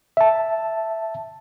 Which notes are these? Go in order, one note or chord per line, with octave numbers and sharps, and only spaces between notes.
E5 A5